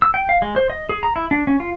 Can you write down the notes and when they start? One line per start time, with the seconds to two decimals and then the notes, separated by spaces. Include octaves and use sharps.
0.02 E6
0.14 G5
0.29 F5
0.42 G#3
0.56 C5
0.70 D#5
0.89 G#4
1.03 A#5
1.16 E4
1.31 D4
1.47 C#4
1.60 F4